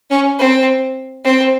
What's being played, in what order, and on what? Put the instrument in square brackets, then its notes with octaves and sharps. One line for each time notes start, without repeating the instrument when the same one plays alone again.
[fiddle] C#4
C4
C4